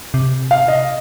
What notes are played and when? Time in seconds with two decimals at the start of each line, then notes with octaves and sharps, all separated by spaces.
0.14 C3
0.51 F5
0.68 D#5